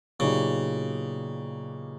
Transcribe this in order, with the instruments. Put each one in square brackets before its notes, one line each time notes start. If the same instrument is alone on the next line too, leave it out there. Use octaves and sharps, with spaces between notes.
[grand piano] A#2 F#3 B3 D#4 G4 [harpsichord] C#3